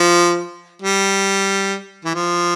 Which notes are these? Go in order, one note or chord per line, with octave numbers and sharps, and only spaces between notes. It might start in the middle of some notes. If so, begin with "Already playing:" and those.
Already playing: F3
G3
E3
F3